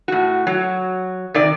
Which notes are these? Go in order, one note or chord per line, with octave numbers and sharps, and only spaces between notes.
A2 F#4
F#3
C3 D#3 D5